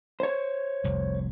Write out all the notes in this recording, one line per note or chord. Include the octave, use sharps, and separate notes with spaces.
C5 C#5
F1 C2 F2